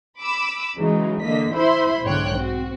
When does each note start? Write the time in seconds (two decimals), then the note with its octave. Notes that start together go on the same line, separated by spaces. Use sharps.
0.18 B5 D6 E6
0.77 C#3 E3 F#3 G#3 D#4
1.23 D3 A#3 D#5 B6
1.54 E4 C5 E5 B5 C6
2.04 B1 G#2 D3 C#5 G5 F#6
2.37 C4 F#4